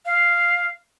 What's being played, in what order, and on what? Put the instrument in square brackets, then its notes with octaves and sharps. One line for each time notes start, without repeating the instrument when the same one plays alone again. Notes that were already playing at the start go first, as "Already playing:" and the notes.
[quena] F5